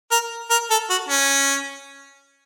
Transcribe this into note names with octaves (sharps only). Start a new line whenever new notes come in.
A#4
A#4
A4
F#4
C#4